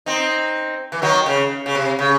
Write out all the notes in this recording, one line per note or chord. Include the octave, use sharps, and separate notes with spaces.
C4 D#4
E3
D#3 F#3
C#3
C#3
C3
C#3